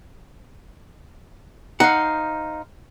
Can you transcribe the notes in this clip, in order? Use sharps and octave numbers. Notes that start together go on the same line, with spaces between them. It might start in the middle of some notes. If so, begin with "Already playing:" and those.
D#4 C5 F5 F#5